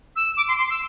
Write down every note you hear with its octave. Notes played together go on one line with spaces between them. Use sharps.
E6
D6
C6
C6
E6